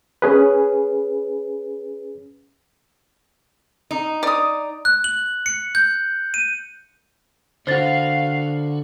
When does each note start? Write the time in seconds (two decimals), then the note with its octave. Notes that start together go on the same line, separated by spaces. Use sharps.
0.22 C#4 G#4 B4
3.91 D#4
4.23 D5 D#6
4.85 F#6
5.04 F#7
5.46 C#7
5.75 G6
6.34 D#7
7.67 D3 F#4 C5 F5 A6